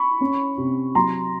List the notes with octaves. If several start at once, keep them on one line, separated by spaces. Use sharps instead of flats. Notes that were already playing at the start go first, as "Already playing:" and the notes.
Already playing: B5 C#6
C#4
C3
F#3 A#5 C6